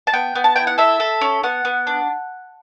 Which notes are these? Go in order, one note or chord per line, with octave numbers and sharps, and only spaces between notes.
A5
B3 G5
B3
A5
E4 G5
F#5
A4 E5
A4
C#4
B3 F#5
B3
D4